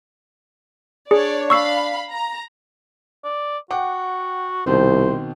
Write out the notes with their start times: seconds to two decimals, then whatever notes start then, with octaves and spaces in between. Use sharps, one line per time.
1.11 D4 G#4 C#5 D5
1.50 F5 B5 C#6 E6 C7
2.10 A#5
3.24 D5
3.71 F#4 F#5 G5 D6
4.66 C2 B2 D#3 C4 C5